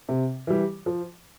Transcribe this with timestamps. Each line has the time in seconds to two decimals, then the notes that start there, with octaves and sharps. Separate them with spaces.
0.09 C3
0.47 E3 G3
0.86 F3